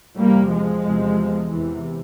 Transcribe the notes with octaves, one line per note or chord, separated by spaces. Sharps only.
E2 C3 G3 A#3
F3 G#3
E2 C3
E2 C3 E3